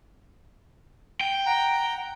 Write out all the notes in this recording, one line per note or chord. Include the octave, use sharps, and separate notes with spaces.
G5
F#5 A#5